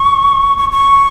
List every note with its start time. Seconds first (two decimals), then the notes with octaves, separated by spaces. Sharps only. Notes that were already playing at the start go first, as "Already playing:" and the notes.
Already playing: C#6
0.58 C#6
0.72 C#6